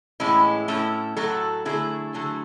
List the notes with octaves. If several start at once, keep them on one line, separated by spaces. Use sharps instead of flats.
A2 E3 G#3 C#4 E4
A2 F#3 A3 C#4 E4
A2 F#3 A3 F#4 A4
D3 F#3 A3 E4 G#4
D3 F#3 A3